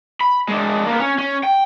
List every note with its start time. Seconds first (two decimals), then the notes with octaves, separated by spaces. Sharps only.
0.21 B5
0.49 G#3 D4
0.87 A#3 B3
1.01 C#4
1.19 C#4
1.43 G5